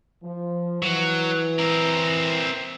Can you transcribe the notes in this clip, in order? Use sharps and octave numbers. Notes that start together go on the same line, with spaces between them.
F3
E3 F#3
C4 A#4